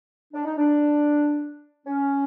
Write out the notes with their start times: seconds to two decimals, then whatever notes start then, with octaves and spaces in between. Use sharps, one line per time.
0.33 D4
0.45 D#4
0.57 D4
1.86 C#4